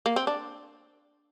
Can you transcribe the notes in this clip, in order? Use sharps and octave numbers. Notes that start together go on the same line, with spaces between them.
A#3
C4
D4